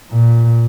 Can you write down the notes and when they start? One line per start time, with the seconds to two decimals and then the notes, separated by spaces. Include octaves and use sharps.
0.12 A#2